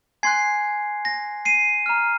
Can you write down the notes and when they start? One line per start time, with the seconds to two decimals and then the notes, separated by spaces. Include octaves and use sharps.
0.23 G#5 C6 F#6 G#6 C7
1.05 A#6
1.45 C7 D#7
1.86 A#5 F6